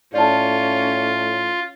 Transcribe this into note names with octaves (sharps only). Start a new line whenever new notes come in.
A2 C#4 F4 D5 A5